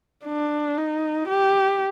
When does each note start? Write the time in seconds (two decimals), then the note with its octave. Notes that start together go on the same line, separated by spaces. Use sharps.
0.25 D4
0.78 D#4
1.28 G4